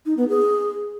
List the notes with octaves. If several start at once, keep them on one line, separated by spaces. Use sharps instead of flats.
D#4
B3
G#4